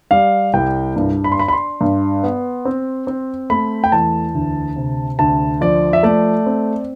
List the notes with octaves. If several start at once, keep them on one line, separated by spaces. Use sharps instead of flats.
G3 F5
C2 G5
G2
B5
C6
D4 B5
B5
C6
G2
B3
C4
C4
A3 B5
G5
E2 A5
D2
C3
D2 A5
F3 D5
E5
A3 D5
C4